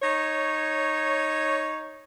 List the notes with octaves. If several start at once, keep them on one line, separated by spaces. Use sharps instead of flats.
D#4 C#5